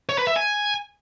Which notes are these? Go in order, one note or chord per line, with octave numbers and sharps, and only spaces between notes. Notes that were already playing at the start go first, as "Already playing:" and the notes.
C#5
B4
E5
G#5